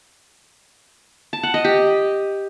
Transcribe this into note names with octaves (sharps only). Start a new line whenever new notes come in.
A5
F#5
D#5
G4